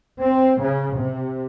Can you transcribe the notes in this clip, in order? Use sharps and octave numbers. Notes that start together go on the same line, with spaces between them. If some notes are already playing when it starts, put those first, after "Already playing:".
C4
C#3
C3